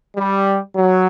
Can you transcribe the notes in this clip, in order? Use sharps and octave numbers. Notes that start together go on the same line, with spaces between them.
G3
F#3